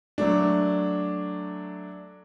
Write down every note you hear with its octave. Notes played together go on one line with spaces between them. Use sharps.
F#3 A3 D4